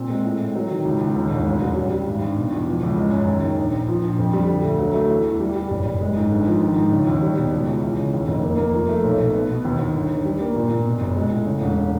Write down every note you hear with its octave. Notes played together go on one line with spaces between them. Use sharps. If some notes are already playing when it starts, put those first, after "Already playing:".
Already playing: A#2 C4
G#3
A2
A2
F#3
D#3
C#2
C#2
D#2
E1
A1
F#3
G3
G3
G#1
G2
B2
E2
F3
C#2
G#3
F#2
D#2
D#3
A#1
A#1
F3
A#1
F2
G3
D3
D2
F#3
A3
E3
E2
G3
G3
F#1
F#1
G#3
G#2
G1
F3
D#3
G#2
C#3
D#2
G3
B2
C#2
C#2
E3
C#3
D#2
F1
A#3
A#3
F3
A3
B1
B1
B3
B2
D#2
D#2
G1
G1
G3
A#3
A#2
A#2
B2
F#1
G#3
A2
C#3
E1